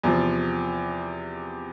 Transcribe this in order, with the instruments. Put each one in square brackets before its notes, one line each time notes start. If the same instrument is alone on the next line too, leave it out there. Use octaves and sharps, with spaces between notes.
[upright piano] E2 C3 F3